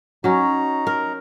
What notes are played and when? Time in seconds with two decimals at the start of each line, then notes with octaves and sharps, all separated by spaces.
0.24 F#3 C#4 D#4 A#5
0.87 A#4